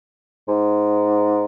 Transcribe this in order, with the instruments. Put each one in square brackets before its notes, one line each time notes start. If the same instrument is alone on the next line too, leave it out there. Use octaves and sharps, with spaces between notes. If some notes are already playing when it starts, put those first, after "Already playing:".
[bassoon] G#2